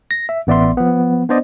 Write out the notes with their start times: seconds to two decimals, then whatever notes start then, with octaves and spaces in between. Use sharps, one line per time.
0.11 A#6
0.29 E5
0.47 A1 B3 D5 E5 C6
0.77 F3 B3
1.29 B3 D4 C5 D5 D#5